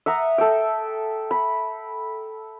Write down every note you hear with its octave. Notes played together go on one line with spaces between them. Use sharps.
E5 F#5 A#5 D#6
A4 G5
B5